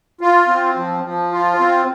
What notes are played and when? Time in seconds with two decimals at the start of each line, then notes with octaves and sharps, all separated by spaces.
0.21 F4
0.48 C4
0.76 F3
1.04 F3
1.32 F4
1.59 C4